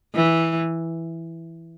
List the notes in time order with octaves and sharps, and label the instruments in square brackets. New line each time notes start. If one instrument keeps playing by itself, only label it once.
[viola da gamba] E3